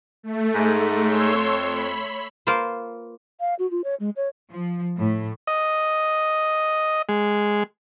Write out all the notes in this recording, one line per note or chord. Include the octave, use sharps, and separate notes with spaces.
A3
G#2
C#5 C6 E6
F2
B5
A#3 F4 B4 C5
F5
F#4
F4
C#5
G#3
C#5
F3
A2
D#5
G#3